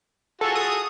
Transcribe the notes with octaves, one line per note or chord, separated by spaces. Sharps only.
F4 F#4 G#4 A4
D#6